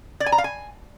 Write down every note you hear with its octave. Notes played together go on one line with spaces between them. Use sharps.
D5
G#5
A#5
F5
G#5